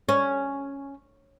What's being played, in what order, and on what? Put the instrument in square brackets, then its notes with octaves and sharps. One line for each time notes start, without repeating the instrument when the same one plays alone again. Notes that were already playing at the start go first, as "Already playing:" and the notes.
[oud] C#4